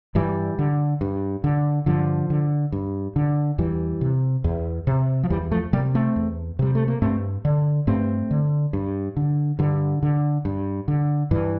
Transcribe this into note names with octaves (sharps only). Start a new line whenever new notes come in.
G2 E3 G3
D3
G2
D3
G2 D3 F3
D3
G2
D3
E2 E3 G3
C3
E2
C3
F3
E2 E3 G3
F3 A3
C3 G3 A#3
A3 C4
E2
C3 G3
A3
A#3
G2 A3 C4
D3
G2 A3 C4
D3
G2
D3
G2 D3
D3
G2
D3
G2 E3